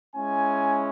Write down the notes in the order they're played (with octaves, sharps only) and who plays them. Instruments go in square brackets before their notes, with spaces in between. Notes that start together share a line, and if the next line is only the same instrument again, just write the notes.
[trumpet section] G#3 C#4 E4 G#5